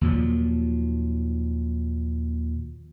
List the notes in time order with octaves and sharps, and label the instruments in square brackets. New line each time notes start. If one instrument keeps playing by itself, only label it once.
[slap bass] D#2 A#2 F3 F#3